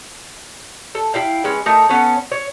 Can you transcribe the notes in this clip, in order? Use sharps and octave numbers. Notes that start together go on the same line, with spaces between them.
A4
E4 F5 G5
G#3 C#4 B4
A3 D#4 A#4
B3 C#4 A4 C#5
C#5